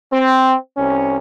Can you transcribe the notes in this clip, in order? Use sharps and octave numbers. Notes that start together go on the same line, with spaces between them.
C4
C2 C#4